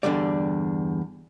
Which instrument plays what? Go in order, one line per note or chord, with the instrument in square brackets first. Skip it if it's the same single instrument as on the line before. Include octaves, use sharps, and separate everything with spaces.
[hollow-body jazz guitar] E2 G2 D3 G3 D5